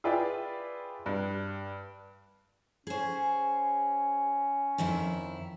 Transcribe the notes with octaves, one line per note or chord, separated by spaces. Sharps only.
F4 G#4 B4 D5 E5 G5
G2
C#4 G#4 C5
F2 D#3 E4